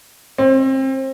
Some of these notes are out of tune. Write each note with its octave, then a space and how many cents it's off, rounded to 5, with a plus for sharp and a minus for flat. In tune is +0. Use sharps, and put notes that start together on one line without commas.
C4 +30